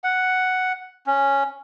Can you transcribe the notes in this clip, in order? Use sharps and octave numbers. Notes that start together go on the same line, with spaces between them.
F#5
C#4